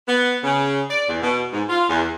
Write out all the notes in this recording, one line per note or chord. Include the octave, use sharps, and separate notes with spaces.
B3
C#3
D5
E2
B2
G#2
F4
E2